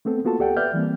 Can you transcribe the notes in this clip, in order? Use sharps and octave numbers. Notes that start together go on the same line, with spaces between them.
A3 B3 C4 A4
A#3 B3 F4 F#4 A4 A5
C#2 G4 A4 D5 F#5 G5
B4 D5 E5 F6 G6
E3 G3 A#3 C4